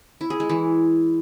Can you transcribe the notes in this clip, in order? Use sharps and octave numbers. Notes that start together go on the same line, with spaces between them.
E4
G#4
G#3
E3